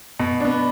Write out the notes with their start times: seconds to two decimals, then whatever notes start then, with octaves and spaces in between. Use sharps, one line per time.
0.20 B2
0.40 B3 D4